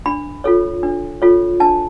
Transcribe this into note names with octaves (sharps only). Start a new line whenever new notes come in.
D4 B5
F4 A4 C#5
D4
F4 A4 C#5
D4 A5